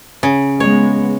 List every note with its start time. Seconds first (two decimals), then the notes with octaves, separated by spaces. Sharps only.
0.23 C#3
0.60 G#3 B3 C#5